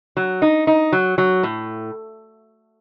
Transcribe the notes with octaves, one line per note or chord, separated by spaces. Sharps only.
F#3
D#4
D#4
F#3
F#3
A2